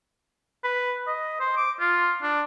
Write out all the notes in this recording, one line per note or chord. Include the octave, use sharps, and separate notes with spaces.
B4
D#5
C5
D6
F4
D4